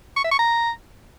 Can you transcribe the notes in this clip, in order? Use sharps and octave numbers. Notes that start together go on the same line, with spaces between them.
C#6
E5
C#6
A#5